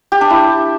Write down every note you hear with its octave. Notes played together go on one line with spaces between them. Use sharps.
G4
D4
E4